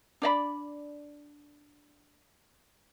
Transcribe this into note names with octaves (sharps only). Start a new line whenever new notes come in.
D4 D5 D#5 B5